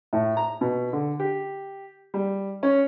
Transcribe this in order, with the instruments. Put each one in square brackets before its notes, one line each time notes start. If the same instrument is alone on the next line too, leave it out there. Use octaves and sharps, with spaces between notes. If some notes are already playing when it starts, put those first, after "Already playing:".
[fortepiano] A2
A#5
B2
D3
G4
G3
C#4